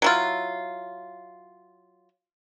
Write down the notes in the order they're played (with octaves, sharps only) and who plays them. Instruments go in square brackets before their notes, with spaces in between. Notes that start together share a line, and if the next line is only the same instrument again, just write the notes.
[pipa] F#3 E4 F4